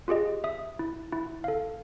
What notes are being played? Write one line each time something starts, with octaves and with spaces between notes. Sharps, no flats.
F4 G4 G#4 D#5
E5 D#6
E4
E4
A4 F5